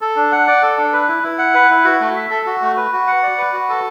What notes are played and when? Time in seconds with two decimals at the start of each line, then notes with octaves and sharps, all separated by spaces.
0.01 A4
0.16 D4
0.32 F#5
0.47 D5
0.63 A4
0.77 D4
0.92 B4
1.08 E4
1.23 E4
1.38 F#5
1.54 B4
1.70 E4
1.84 F#4
2.01 A3
2.16 E5
2.31 A4
2.46 F#4
2.62 A3
2.77 B4
2.93 F#4
3.07 F#5
3.23 D5
3.38 B4
3.53 F#4
3.69 A4